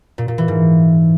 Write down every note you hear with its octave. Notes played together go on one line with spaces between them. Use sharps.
A#2
A#2
E3
G#2